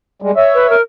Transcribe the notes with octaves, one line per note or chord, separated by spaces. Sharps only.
G3 G#3
C#5 E5
B4
A#4